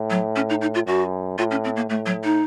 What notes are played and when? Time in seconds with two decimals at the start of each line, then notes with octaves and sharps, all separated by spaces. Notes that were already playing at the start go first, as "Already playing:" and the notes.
Already playing: A2
0.10 F#3
0.36 C#4
0.50 D#4
0.61 D#4
0.74 F4
0.87 F#2 F#4
1.38 A2 F4
1.51 C#4
1.64 C4
1.76 A#3
1.90 A2 A3
2.06 F#3
2.24 D#4